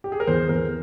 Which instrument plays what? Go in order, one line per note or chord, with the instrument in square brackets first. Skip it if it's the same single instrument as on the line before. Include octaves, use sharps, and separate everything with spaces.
[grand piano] G4
G#4
A#4
[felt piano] E2 [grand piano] C5
[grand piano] G#4
[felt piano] E2 [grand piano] A#4